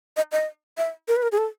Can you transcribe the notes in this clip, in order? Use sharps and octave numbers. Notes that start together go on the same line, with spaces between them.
D#5
D#5
E5
A#4
B4
A#4
G#4
A4